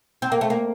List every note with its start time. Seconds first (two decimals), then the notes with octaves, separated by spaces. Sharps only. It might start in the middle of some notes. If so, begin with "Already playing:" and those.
0.22 C4
0.32 A#3
0.41 A3
0.50 A#3